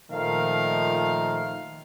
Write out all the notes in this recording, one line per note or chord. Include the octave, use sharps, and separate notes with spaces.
A#2 D#3 F3 A3 A#4 F5